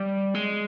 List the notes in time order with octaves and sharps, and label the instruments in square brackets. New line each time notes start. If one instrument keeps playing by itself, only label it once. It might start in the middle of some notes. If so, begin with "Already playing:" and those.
Already playing: [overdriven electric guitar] G3
G#3